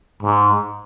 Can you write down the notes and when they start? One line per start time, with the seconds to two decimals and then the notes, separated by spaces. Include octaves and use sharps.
0.23 G#2